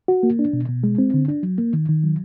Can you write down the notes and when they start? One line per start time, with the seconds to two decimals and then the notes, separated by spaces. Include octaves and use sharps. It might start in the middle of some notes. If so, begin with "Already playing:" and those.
0.08 F#4
0.23 A#3
0.39 D4
0.53 B2
0.68 B2
0.84 G#3
0.98 C4
1.14 D3
1.28 D4
1.43 F#3
1.58 A#3
1.73 D#3
1.89 D#3
2.03 F#3